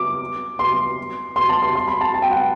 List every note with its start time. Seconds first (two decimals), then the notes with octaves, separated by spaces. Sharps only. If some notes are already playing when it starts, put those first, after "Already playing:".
Already playing: D6
0.59 C6
1.36 C6
1.49 A5
1.62 C6
1.75 C6
1.88 B5
2.01 A5
2.14 A5
2.22 G5
2.31 F#5